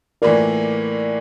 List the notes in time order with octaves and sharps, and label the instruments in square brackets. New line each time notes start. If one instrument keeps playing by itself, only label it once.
[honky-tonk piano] A2 E3 A#3 F4 [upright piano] A#4 D5